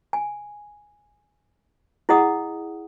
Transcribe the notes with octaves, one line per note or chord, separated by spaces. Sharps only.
G#5
E4 G#4 D#5 F#5 D#6